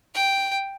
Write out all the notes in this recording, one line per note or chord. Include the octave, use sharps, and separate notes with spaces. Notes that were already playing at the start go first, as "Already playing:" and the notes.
G5